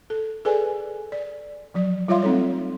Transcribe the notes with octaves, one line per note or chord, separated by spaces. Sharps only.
A4
G#4 A4 B4 D5 G#5
D5
F3 F#3 D5
G3 F4 C#5 E5 F5 C6
A3 C4 D#4 A4 C#5